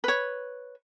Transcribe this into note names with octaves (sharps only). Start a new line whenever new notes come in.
B4 C#5